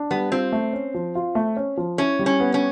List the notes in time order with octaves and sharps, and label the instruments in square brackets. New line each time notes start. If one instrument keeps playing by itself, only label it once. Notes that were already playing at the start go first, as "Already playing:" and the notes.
Already playing: [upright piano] D4
[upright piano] G3 [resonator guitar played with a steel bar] B3
[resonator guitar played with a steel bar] C4 [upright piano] F4
[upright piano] A3
C#4
F3
F4
A3
C#4
F3
[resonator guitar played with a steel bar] C#4 [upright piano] E4
[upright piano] G3
[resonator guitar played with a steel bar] C#4
[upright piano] B3
[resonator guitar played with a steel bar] C#4